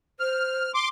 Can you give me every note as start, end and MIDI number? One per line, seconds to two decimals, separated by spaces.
0.20 0.69 72
0.20 0.72 89
0.74 0.89 84
0.74 0.89 86